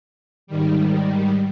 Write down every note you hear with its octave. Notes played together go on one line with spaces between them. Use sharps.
G#2 D#3 G3